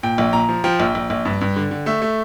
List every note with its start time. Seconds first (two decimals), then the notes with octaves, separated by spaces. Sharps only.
0.03 A#2 G5
0.18 A#1
0.33 A#2 A#5
0.49 F3
0.64 F3 G5
0.80 A#1
0.95 A#1
1.10 A#1
1.25 G2
1.41 G2
1.56 D3
1.71 D3
1.86 A3 E5
2.02 A3